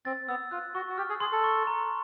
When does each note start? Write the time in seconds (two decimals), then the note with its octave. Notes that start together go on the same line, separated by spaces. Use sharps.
0.05 C4 A6
0.28 B3 E6
0.51 F4 F#6
0.74 F#4 C#6
0.89 F#4
0.97 G4 F6
1.09 G#4
1.20 G#4 C6
1.32 A4
1.44 C#6
1.67 A#5